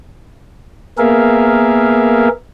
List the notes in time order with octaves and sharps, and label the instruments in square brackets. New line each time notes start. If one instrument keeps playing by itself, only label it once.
[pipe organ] A#3 B3 G#4 A#4 E5 F5